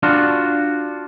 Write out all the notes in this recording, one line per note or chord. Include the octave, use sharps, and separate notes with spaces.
D4 F4 F#4